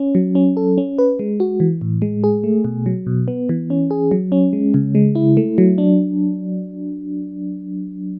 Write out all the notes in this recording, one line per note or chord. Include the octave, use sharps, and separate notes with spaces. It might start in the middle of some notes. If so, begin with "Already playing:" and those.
Already playing: C#4
F#3
C#4
A4
C#4
B4
G#3
F#4
E3
A2
G#3
G#4
A3
B2
F#3
B2
B3
E3
C#4
G#4
F#3
C#4
G#3
C#3
G#3
E4
A3
F#3
D4